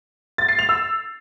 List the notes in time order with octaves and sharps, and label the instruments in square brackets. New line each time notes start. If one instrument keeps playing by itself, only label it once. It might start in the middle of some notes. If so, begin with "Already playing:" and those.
[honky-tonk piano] A6
C7
F7
E6